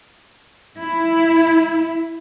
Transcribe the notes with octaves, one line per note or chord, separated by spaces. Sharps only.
E4